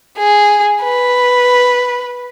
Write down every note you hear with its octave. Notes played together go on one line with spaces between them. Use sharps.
G#4
B4